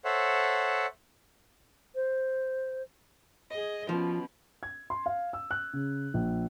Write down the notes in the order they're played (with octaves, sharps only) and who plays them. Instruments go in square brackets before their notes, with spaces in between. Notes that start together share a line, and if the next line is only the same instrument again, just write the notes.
[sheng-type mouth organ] A4 C5 C#5 E5 F#5
[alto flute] C5
[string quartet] G#4 D#5
[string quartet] B2 C#4 [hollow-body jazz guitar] F3
[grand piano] G#6
C6
F5
E6
F#6
C#3
A#1